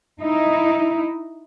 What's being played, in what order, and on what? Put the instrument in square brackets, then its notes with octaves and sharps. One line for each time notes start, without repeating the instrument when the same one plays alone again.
[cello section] D#4 E4